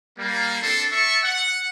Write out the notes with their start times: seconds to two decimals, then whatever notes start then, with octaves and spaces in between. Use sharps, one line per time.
0.18 G3 A#3
0.61 C4 D4 A4 C6
0.91 D5 E5 A5 C#6
1.23 F#5